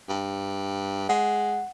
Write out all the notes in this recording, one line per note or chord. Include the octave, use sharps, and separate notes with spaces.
G2
G#3 F#5